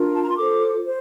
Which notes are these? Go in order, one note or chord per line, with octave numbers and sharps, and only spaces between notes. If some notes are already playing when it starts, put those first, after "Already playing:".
Already playing: D4 F4 A#4
A5
A#5
C6
F4 A4 C5 D6
C5